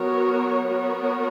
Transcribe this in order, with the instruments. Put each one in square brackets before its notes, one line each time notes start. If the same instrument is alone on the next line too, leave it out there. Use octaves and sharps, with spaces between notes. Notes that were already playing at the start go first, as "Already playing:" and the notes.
Already playing: [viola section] F#3 B3 F#4 A#4 C#5
B3 F#4 A#4 C#5